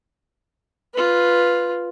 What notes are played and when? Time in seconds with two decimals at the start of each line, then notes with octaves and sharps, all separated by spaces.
0.94 F4 B4